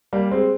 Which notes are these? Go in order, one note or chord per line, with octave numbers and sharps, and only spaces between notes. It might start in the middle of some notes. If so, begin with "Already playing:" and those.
G3 A#3
G#3 C4